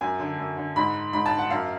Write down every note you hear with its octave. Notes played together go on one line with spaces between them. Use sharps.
F#2 G#5
D3
F#2
D3
G#2 B5
G#2 B5
A5
F#5
F#2 F5